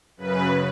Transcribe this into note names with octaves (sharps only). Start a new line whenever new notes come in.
F#2 C#3 B4